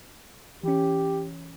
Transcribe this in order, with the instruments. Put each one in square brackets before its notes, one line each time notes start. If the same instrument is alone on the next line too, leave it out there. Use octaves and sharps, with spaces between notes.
[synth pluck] E3 C#4 [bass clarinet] G4